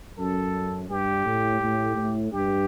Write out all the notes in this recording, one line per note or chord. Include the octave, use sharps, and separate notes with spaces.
F#2 A4
G2 G4
A2
A2
A2
G2 G4